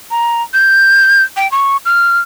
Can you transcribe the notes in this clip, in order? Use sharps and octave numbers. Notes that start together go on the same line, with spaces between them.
A#5
G6
G5
C#6
F6